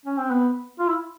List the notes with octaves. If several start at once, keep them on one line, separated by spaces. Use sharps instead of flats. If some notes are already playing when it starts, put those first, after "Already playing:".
C#4
C4
B3
F4
E4